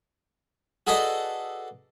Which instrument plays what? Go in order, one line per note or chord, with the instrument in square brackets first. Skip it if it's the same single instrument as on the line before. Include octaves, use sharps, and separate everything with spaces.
[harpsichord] F#4 G#4 A4 B4 D5 D#5